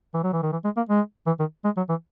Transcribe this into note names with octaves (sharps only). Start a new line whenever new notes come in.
E3
F#3
E3
D#3
E3
G#3
A#3
G#3
E3
D#3
G#3
F#3
E3